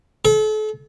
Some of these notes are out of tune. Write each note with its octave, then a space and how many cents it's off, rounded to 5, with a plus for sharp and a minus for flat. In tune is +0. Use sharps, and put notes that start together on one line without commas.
A4 -40